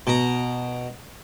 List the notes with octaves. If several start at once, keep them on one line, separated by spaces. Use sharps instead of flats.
B2 A#5